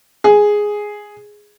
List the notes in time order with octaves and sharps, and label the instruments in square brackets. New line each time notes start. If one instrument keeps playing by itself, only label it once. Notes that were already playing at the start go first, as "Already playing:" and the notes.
[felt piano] G#4